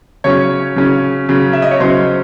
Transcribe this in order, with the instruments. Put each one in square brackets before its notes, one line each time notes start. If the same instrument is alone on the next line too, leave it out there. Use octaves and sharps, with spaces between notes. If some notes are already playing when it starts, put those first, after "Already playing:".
[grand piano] C#3 F#3 C#4 C#5
C#3 F#3 C#4
C#3 F#3 C#4
E5
D#5
C#5
C#3 F#3 C#4 C5